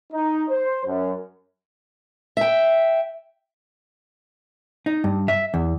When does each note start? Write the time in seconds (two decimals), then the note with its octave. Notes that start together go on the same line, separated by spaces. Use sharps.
0.12 D#4
0.50 C5
0.86 F#2
2.37 E5 G5
4.86 D#4
5.04 G2
5.28 E5
5.54 E2